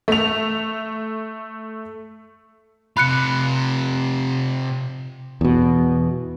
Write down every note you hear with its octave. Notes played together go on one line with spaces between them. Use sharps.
A3 F7
C3 F4 B5 F#6 C#7
E2 B2